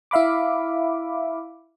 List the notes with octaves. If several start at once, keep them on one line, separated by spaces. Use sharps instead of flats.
E4 E5 F5 B5 D6